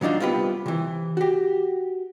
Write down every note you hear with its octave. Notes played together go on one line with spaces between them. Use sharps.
A#2 F#3 D4 D#4 F4
C2 B3 F4 G4 B4
C3 E3
F#4 G4